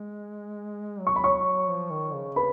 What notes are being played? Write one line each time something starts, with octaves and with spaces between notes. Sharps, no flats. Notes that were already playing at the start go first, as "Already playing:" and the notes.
Already playing: G#3
F#3
C#6
B5
C#5 C#6
F3
D#3
C#3
B4 B5